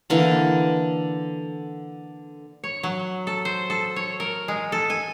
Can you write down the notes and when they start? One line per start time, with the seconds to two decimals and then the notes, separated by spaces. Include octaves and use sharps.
0.10 D3 E3 A#3
2.64 C#5
2.83 F#3
3.27 A4
3.45 C5
3.70 A4
3.96 C#5
4.20 A#4
4.48 G#3
4.72 A4
4.90 G#5